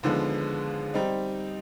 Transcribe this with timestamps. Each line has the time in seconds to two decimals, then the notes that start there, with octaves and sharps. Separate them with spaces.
0.03 D#2 D3 F3 G#3 B3
0.94 G3 C4 D#4